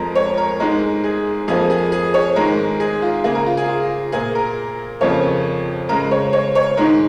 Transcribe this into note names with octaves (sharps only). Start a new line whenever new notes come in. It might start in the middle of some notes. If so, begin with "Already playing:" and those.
Already playing: F2 F3 G#3 A#4
C#5
A#4
G#2 G#3 A#4
G#4
F2 F3 A#3 G#4
G#4
G#4
C#5
G#2 D#3 G#3 A#4
G#4
F4
C#3 A#3 G#4
A#4
F4
G#4
F4
A#2 A#3 G#4
A#4
F2 C#3 F3 A#3 C#5
C#3 G#3 A#4
C#5
C#5
C#5
G#2 D#3 G#3 A#4